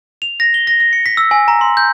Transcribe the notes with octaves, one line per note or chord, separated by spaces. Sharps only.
F7
A#6
G7
A#6
A#6
C#7
B6
E6
G#5
A#5
C6
G6